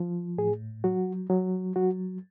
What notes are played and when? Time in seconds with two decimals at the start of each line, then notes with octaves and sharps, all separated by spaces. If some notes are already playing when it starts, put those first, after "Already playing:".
Already playing: F3
0.38 A2 G#4
0.84 F#3 F#4
1.30 F#3
1.76 F#3 F#4